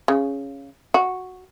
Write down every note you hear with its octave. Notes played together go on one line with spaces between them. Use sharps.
C#3
F#4